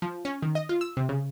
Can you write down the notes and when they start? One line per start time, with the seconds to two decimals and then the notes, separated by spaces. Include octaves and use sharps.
0.02 F3
0.25 C#4
0.42 D#3
0.55 D#5
0.69 F4
0.81 E6
0.97 C3
1.09 C#3